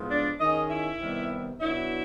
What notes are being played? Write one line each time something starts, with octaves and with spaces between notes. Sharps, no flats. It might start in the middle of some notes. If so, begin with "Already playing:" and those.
Already playing: A2 F3 G#3 B3
D4 D5
D#3 G#3 C#4 D#4 D#5
E4 E5
C3 D#3 G3 B3
B2 F#3 B3 D4 E4 E5